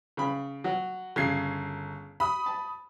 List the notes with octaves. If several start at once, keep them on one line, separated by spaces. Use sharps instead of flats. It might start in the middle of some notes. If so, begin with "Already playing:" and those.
C#3 B5
F#3
G1 C#3 G#6 C7
B5 D#6
A5